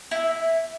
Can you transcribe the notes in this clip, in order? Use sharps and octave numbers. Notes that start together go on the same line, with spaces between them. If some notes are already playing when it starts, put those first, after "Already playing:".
E4